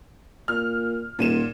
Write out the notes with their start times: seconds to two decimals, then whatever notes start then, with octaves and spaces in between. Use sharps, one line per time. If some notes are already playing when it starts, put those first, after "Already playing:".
0.48 A#2 F6
1.19 D#1 A#2 D#7 E7